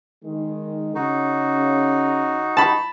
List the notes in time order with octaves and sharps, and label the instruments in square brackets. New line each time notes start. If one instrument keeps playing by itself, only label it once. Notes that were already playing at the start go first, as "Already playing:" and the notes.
[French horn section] D#3 G#3
[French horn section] C#3 [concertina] D#4 F#4
[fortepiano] A5 B5